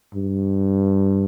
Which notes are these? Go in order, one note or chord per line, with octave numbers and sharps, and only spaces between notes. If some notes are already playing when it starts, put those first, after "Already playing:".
G2